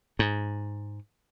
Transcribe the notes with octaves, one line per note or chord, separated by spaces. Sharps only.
G#2